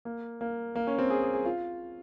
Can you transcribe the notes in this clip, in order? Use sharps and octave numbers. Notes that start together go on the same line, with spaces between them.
A#3
A#3
A#3
C#4
C4
G#4
G#4
G#4
F4